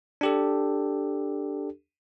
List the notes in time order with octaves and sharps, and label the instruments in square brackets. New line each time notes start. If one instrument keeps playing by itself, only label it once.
[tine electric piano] D4 G4 A4